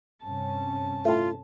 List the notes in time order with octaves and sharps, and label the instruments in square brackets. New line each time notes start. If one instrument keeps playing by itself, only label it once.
[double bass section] G2 C3 C#4 [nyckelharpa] A5
[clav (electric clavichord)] A2 A3 [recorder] F4